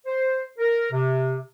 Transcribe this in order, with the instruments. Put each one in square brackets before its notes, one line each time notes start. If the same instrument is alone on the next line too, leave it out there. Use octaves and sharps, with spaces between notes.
[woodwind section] C5
A#4
C3